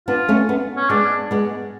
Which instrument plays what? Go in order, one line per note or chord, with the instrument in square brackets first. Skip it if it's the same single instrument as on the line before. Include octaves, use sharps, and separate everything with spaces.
[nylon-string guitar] B3 D4 [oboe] F4
[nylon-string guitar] A3 C#4
B3 D4
[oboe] C#4
[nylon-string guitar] G#3 B3 [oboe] D4
[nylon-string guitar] G#3 B3